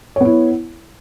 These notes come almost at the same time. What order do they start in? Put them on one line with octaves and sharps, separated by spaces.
C#5 B3 E4